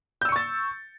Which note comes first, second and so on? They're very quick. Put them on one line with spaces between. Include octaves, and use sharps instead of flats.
G6 E6 C#7 C#6 A6